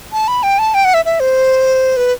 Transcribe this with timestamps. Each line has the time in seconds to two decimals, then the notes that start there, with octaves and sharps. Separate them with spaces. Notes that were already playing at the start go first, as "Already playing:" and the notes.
0.12 A5
0.28 B5
0.43 G5
0.59 A5
0.74 G5
0.85 F#5
0.94 E5
1.05 E5
1.20 C5
1.97 B4